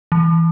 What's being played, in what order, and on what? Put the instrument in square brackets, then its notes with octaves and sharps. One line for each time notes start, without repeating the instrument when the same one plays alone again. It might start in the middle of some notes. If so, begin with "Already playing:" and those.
[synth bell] E3